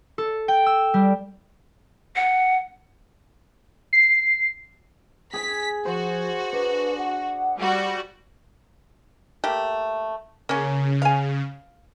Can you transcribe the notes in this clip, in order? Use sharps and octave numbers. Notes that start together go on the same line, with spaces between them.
A4
G5
E6
G3
F#5
C7
G#4 G#5 B6
F3 F#4 C5
D4 B4
F#5
G3 F#4
A3 A#3 G4
C#3 A#3 C#4
F5 G#5